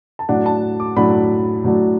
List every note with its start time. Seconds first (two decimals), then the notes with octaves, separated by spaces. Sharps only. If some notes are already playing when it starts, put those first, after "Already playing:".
0.19 A5
0.29 A2 F#3 D4 F#5
0.46 A5
0.80 D6
0.96 A2 F#3 D4 B5
1.64 A2 F#3 D4